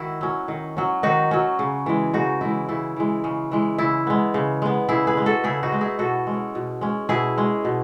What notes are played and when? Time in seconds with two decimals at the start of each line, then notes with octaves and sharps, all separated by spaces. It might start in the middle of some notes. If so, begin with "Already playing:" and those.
Already playing: D#3 E4 F#4
0.21 F#3 C#4
0.48 D#3
0.77 F#3 C#4
1.03 D#3 D#4 F#4
1.31 F#3 C#4
1.59 C#3
1.86 E3 G#3
2.13 C#3 D#4 F#4
2.41 E3 G#3 E4
2.69 C#3 E4
2.96 E3 G#3
3.24 C#3
3.52 E3 G#3
3.78 C#3 E4
4.07 G#3 B3
4.34 C#3
4.62 G#3 B3
4.89 C#3 E4 G#4
5.07 G#4 B4
5.17 G#3 B3
5.26 F#4 A4
5.44 C#3 E4 G#4
5.63 D#4 F#4
5.72 G#3 B3
5.81 E4 G#4
5.99 B2 F#4 A4
6.27 G#3 C#4
6.55 B2
6.81 G#3 C#4
7.09 B2 E4 G#4
7.38 G#3 C#4
7.65 B2